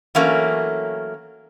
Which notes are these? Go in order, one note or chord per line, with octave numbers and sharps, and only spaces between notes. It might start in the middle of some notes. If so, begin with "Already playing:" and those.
E3 F#3 A3 A#3 C#4